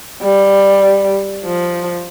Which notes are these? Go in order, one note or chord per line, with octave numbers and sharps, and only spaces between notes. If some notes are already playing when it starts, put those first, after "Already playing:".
G3
F3